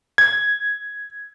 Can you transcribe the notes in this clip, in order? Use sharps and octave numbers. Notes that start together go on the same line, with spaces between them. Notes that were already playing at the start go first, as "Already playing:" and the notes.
G#6